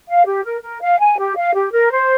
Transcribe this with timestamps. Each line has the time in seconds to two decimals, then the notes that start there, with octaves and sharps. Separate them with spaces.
0.09 F5
0.26 G4
0.45 A#4
0.63 A#4
0.82 F5
1.00 G#5
1.18 G4
1.36 F5
1.55 G4
1.73 A#4
1.91 C5